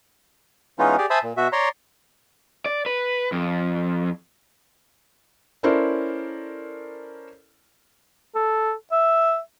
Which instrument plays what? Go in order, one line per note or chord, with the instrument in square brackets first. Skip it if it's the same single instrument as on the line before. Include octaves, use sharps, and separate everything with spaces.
[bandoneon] E3 G#3 B3 C#4 D#4 F4
G4 G#4 D5
C5 E5 G#5 A5 B5 D#6
A#2
B2 F#4 E5
C#5 D5 A#5 C6
[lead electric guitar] D5
B4
F2
[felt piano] C#4 E4 A4 A#4 C5 D5
[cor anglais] A4
E5